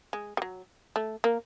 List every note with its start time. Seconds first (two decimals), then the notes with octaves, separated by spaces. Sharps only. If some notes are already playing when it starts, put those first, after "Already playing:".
0.13 G#3
0.37 G3
0.42 F#3
0.96 A3
1.24 A#3